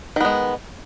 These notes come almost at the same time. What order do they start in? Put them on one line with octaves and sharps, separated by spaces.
D#3 B3 G#3